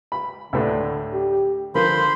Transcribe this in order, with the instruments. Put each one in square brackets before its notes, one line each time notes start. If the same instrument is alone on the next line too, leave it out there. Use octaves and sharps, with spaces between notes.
[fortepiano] B5
[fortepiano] D2 A2 D4 [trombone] D3
[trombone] G4
[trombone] D3 [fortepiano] F3 A#4 [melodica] C5 B5 C6